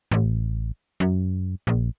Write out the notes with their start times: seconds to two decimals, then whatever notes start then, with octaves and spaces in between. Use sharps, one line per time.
0.12 A1
1.00 F#2
1.67 A#1